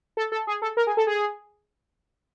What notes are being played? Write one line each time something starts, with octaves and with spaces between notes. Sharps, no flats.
A4
A4
G#4
A4
A#4
G#4
A4
G#4